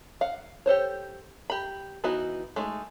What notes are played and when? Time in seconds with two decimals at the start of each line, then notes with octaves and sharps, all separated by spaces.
0.21 F5 F#5
0.66 G4 A4 C5 C#5
1.50 G4 B5
2.04 E3 B3 D#4 E4 F#4
2.56 G#3 A3 D#4